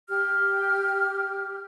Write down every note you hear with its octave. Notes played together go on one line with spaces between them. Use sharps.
G4 F6